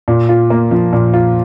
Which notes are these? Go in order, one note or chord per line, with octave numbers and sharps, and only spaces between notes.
A#2
F4
A#3
F3
A#2
F4